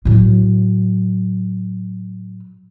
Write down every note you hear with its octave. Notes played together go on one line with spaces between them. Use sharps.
A2 F#3